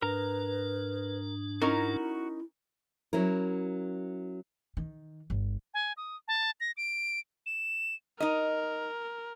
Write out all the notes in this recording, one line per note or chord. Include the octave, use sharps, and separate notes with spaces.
G#2 D4 A#4 B4 A#5
C#4 D#4 E4 F#4 A#4 C#6
F#3 C#4 E4 A#4
D#3
G1
G#5
D#6
A5
A#6
D7
E7
D#4 A#4 D#5